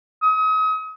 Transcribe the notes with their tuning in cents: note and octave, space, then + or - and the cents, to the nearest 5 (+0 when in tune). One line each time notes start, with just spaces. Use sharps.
D#6 +35